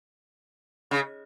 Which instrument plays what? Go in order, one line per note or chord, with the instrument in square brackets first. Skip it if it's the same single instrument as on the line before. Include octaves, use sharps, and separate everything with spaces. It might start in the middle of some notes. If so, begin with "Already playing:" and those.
[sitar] C#3